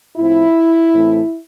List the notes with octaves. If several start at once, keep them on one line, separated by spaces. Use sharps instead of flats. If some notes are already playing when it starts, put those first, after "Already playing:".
A2 F3 C4 E4
A2 E3 A3 C4